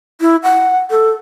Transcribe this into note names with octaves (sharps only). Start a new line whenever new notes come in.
E4
F#5
A4